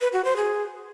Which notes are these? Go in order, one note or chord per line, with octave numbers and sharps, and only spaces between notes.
B4
F#4
C5
G#4